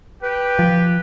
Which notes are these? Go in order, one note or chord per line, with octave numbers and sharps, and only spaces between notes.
G4 B4 G5
F3